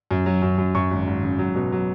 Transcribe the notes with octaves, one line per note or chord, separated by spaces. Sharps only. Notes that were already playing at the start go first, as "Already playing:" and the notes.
F#2
F#3
F#2
F#2
F#2 C#6
G#1
G#1
C#3
F#3
B2
F#3